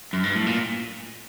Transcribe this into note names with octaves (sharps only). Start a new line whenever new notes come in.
F#2
G2
A2
A#2